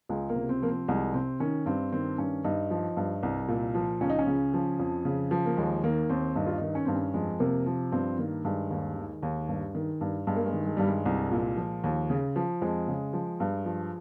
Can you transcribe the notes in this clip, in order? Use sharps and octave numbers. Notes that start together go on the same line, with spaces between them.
C#2 G#3
A#3
C3
C4
F3 A#3
C4
C2 G#3
C3 C4
D#3 C#4
G2 C4
D#3 C4
G2 C#4
G2 D#4
F3
G2
C2
A#2
F3
C#2 C#4
D#4
C#4
C#3
F3
F2
C#3
F3
A#3
D#2 G#3
D#3 A#3
D#2 C4
G2 D#4
F4
D#3 D#4
C#4
G2 C4
C#4
F2 G#3
C3 A#3
F3
G2 C4
D#3 A#3
G2 G#3
D#2
D#3
D#2
G2
D#3
G2
G2 G#3
A#3
G#3
D#3
G#3
G2 G3
G#3
C2
A#2
F3
D#2
C#3
F3
F2 G#3
C#3
F3
G2
F3